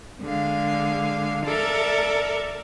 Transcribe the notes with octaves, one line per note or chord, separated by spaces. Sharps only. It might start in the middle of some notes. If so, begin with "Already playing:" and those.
D3 G#3 F5
A4 A#4 D5 E5